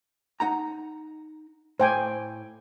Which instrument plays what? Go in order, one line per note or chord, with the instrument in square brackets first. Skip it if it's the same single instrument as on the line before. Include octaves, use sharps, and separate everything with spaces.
[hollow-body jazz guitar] D#4 F#5 A#5
[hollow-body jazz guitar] A2 [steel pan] C5 G5 G#5